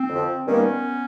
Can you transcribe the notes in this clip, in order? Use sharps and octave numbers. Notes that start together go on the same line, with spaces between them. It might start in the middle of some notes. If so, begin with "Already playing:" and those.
Already playing: C4
F2 D3 F3
G2 D#3 G3 A#3 B3 C#4